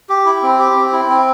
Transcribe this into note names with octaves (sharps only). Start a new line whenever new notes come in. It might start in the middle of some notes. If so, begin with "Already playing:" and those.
G4
E4
C4
G4
C4
E4
C4